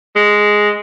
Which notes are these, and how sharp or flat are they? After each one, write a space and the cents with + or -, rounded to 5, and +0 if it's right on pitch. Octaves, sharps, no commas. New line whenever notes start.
G#3 +0